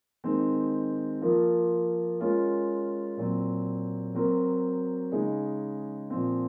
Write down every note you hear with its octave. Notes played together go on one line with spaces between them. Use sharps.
D#3 G#3 C4 D#4
F3 A#3 F4 A#4
G#3 C#4 F4 A#4
A#2 F#3 C4
F#3 C4 F#4 A#4
C#3 G#3 D#4 G#4
A#2 F3 C4